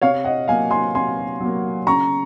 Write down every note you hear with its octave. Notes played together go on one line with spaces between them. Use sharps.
C3 C#5 F5
D#5 F#5
F#3 A#3 F5 G#5
G#5 C6
C3 G#5 C6
F#3 A#3
C#3 A#5 C#6